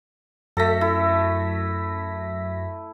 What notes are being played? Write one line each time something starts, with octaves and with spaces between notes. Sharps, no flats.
F#2 A3 A4 A#6 B6
E4